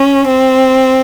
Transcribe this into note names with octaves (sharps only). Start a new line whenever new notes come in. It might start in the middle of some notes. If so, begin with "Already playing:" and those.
Already playing: C#4
C4